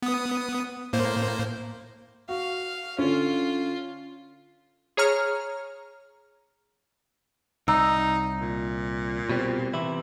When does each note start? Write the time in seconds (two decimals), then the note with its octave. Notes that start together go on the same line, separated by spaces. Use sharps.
0.02 B3 D#6
0.93 A2 A#3 C5
2.29 F#4 F5
2.98 D3 C#4 F4
4.97 G#4 C#5 A#5 F6
7.68 C2 D#4 A#5 E6
8.41 A#2
9.29 B2 G3 C4
9.74 C3 E3 E4